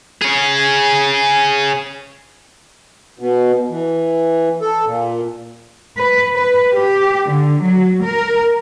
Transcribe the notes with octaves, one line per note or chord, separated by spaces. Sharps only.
G#4 C#5
B2
E3
A4
A#2
B4
B4
G4
D3
F#3
A#4